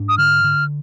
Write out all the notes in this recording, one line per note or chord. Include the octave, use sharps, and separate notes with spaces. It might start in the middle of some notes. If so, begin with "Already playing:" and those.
Already playing: G#2 D4
D#6
D3 F6
D3